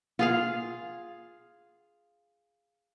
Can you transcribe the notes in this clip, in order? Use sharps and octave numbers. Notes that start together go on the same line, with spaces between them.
F4 G#4 F5